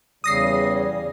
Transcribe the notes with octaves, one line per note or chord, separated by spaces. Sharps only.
E2 C#3 G3 D#6 A#6 C7